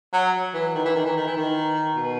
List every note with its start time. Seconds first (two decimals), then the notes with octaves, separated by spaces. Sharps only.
0.14 F#3
0.54 E3
0.75 D#3
0.85 E3
0.96 D#3
1.06 E3
1.17 D#3
1.27 E3
1.37 D#3
1.96 B2